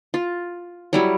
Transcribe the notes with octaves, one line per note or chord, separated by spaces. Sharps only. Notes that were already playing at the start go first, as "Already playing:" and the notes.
F4
F#3 G3 E4